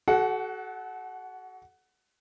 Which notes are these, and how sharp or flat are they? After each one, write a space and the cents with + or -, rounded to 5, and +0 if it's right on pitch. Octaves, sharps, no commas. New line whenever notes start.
F#4 +25 A4 -35 F#5 +0